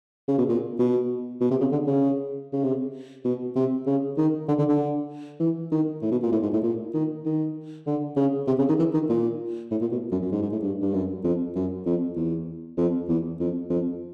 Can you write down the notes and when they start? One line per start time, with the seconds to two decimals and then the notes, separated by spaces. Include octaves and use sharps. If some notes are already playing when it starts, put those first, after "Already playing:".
0.28 C#3
0.38 B2
0.49 A#2
0.79 B2
1.41 B2
1.51 C3
1.61 C#3
1.72 D3
1.87 C#3
2.53 C#3
2.64 C3
3.25 B2
3.56 C3
3.87 C#3
4.18 D#3
4.48 D3
4.59 D3
4.69 D3
5.40 E3
5.72 D#3
6.02 A2
6.12 B2
6.23 A#2
6.32 A2
6.43 G#2
6.53 A2
6.63 A#2
6.94 D#3
7.25 D#3
7.87 D3
8.17 C#3
8.47 C3
8.59 C#3
8.69 D#3
8.79 E3
8.94 D#3
9.09 A#2
9.71 A2
9.81 A#2
9.92 B2
10.12 F#2
10.22 F#2
10.32 G#2
10.42 G#2
10.52 A2
10.62 G2
10.82 G2
10.94 F#2
11.24 F2
11.56 F#2
11.86 F2
12.16 E2
12.78 F2
13.09 E2
13.40 F2
13.70 F2